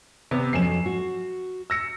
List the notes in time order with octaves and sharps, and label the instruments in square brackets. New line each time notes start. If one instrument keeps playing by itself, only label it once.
[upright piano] C3 B3
[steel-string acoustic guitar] F2 F#3 C#4 [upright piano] C7 E7
[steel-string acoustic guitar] F#4
[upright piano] E6 A#6 C#7